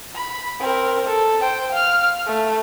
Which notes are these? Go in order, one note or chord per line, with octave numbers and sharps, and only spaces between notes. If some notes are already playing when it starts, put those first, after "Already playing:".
B5
C4 A#4
A4
C5 G5
F5 F6
A3